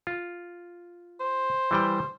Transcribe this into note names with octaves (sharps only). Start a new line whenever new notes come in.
F4
C5
E3 G3 G5